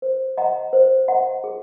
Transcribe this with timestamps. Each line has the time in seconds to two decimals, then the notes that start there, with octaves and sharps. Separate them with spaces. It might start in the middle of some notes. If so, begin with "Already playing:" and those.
0.02 C5
0.38 D#5 F#5 A#5
0.73 C5
1.08 D#5 F#5 A#5
1.44 G#4